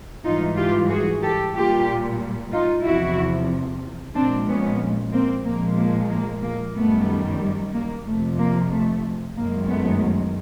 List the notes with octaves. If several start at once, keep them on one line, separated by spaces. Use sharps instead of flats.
G#2 E3 G3 D#4 F4
F4 G4
F#4 G#4
G4 A4
A#2 G3 F4 G4
D#4 F4
E2 C3 F3 E4 F#4
A#2 F3 G#3 C4 D4
B3 C#4
A#3 C4
A#2 F3 G#3 A#3
A#3
A#3
A#3
F#2 D#3 G3 A3 B3
A#3
F2 C3 F3 A3
A#3
A3
F#2 D#3 G#3 A#3
A3 B3